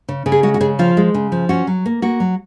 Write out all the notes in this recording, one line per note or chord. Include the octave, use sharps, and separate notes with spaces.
C#3
C#3
G#4
G#3 F#4
F#4
C#3 G#4
F3 F4
G#3
C#3
F3
C#4 F#4
F#3
A#3
A#3 F#4
F#3